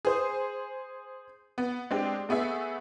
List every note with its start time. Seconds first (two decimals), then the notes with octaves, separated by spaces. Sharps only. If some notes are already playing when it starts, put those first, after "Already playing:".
0.05 G#4 C5 D#6
1.58 B3
1.91 G#3 C4 D4 G4
2.29 A3 B3 G#4 E5